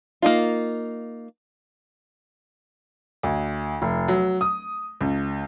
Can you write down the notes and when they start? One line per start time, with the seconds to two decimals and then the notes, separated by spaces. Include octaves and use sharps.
0.22 A#3 D#4 F4
3.23 D2
3.82 F1
4.08 F#3
4.41 D#6
5.01 C#2